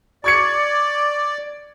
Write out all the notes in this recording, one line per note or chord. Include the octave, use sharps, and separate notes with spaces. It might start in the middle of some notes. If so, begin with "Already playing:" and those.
D5 C#6 G#6 C#7